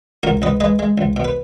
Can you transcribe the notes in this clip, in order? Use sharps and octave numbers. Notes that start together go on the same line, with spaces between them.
C#2 F#4 A#4
C#2 B4 D#5
G#3 B4 D#5
G#3
C#2
B2
B4